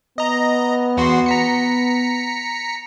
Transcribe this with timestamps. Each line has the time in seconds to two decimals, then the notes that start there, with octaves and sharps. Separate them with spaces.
0.18 B3 D#5 A#5
0.97 E2 F#4 C6
1.26 A#5 B6 C#7